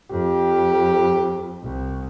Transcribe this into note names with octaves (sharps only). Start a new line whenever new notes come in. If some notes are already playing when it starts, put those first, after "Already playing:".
F2 G4
C2